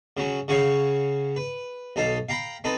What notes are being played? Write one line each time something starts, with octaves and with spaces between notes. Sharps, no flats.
C#3 F#3 C#4
C#3 C#4 F#4 C#5 F5
B4
B1 D#4 A4 F5
F5 G5 A#5 B5
C4 D#4 A4 B4